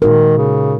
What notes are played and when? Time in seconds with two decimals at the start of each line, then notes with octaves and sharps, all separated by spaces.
0.01 A#2 D#3 G#3 D#4 F#4 A#4
0.37 C#3